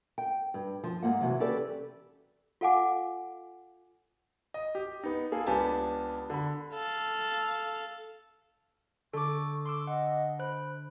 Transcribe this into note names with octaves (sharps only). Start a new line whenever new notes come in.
G5
G2
F3
G#2 A#3 F#5
C3 E3 F#3
C#4 G4 A4 B4 D5
F4 A4 F5 F#5 G#5 D6
D#5
G4
B3 D#4
A#3 G#4 A4
C#2 B3 D4 G4 G#5 A5
D3 B5
A4 F5
D3 A4 C#6 D6
C6 D6 E6
D#5 F#5
C5 B5 F#6